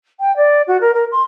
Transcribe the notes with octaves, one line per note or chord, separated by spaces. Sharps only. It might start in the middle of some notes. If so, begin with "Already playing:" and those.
G5
D5
F#4
A#4
A#4
C6